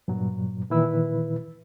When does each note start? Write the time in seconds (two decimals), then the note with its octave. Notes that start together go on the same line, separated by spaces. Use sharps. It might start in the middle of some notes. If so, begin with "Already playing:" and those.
0.08 G2 A#2 F#3
0.70 A#2 D#3 E3 E4 B4 E6